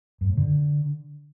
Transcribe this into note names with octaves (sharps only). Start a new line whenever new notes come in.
F#2
A2
D3